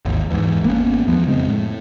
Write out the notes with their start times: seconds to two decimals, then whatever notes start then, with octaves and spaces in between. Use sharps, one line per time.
0.05 G#1 D#2
0.30 E2 G#2
0.64 G#1 A#3 B3 C#4
1.07 E2 F3 B3
1.26 F2 C#3 G#3 C4
1.48 A2